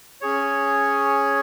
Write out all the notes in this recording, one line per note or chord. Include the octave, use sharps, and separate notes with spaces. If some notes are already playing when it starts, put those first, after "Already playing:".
C#4 G#4 C#5